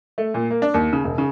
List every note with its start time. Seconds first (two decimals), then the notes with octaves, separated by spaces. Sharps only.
0.18 A3
0.34 A#2
0.51 A#3
0.62 D4
0.74 D#2
0.93 C#3
1.04 E1
1.18 C#3